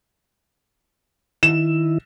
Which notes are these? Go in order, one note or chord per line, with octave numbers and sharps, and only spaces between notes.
D#3 E4 E7